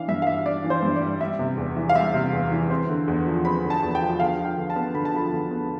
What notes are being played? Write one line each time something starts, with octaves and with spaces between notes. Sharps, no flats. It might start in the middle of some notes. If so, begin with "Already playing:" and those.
Already playing: E3 D4 F5
G2 E5
F5
G3 E5
D4 D5
E3
C5
G2
D5
G3
G3 E5
C3
E2
E3
F5
G3 E5
C3
E2
E3
C4
D3
E2
F3
C4 B5
D3
A5
E2
G5
F3
D3 F5
F3
G5
D3
A5
B3
D3 B5
A5
F3 B5
D3
B3